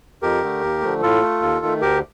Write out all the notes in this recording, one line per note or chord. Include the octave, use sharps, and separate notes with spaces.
F2 G4 A#4
D3 A3
D#2
D3 F3 A3
A2 F4 A4
A3
D#2
D#3 A3
D2 G4 A#4